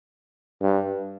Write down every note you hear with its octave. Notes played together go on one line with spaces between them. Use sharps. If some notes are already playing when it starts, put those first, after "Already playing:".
G2